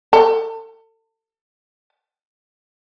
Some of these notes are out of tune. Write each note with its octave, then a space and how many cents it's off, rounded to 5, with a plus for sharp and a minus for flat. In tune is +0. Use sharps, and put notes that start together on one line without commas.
A4 +35